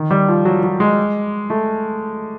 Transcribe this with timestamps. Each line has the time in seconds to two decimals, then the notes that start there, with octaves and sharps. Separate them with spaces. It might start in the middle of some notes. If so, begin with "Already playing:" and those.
Already playing: D#3
0.11 G3
0.28 F3
0.45 F#3
0.63 F#3
0.80 G#3
1.50 A3